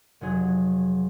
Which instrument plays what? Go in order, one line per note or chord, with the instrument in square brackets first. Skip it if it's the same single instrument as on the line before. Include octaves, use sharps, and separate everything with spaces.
[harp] F1 F#3 G#4